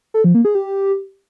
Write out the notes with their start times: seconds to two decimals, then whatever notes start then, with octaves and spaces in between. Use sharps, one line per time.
0.14 A4
0.24 F3
0.35 A#3
0.45 G#4
0.55 G4